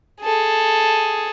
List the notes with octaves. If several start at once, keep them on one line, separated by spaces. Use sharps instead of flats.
G#4 A4